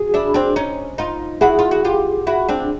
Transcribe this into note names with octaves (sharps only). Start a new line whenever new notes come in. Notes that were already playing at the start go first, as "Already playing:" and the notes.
Already playing: F#4 G#4
D4 E4
C4 D4
C#4 D#4
D#4 F4
E4 F#4 G#4
F4
F#4
F4 G4
E4 F#4
C4 D4